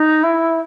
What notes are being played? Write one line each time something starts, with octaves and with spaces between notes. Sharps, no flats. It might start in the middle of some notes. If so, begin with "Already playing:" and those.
Already playing: D#4
E4